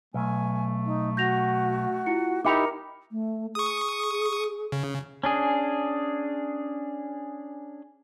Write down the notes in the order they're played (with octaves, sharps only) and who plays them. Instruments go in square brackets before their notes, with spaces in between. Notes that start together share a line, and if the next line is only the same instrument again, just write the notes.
[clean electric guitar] B1 [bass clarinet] A3 [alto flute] G#5
[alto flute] D#4
[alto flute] F#4 [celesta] G6 A#6 F7
[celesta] E4 F4 C#7
[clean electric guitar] D#4 E4 G4 [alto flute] A#4 [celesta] D6 C#7 F7
[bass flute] A3
[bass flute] G#4 [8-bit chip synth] C#6 D#6
[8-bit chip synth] C#3
[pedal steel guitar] C#4 D4 G#4